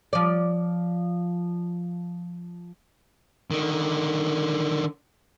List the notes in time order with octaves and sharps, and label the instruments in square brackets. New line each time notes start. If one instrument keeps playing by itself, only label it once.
[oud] F3 D5
[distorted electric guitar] D3 D#3